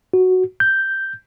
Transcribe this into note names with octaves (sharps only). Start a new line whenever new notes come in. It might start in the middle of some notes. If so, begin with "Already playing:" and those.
F#4
G6